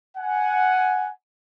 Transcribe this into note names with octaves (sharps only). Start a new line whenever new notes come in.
F#5 G#5